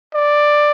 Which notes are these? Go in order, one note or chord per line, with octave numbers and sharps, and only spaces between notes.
D5